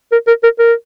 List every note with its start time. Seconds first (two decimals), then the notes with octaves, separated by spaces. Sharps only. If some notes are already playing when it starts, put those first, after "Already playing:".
0.12 A#4
0.27 A#4
0.43 A#4
0.59 A#4